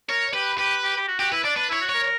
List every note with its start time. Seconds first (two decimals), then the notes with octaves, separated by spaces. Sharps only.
0.09 A#4 C#5
0.34 G4 B4
0.58 G4 B4
0.83 G4
0.96 G4
1.08 F#4
1.19 F#4 G4
1.32 E4 B4
1.44 D4 D5
1.56 D4 B4
1.69 E4 C#5
1.81 F#4
1.89 A#4 C#5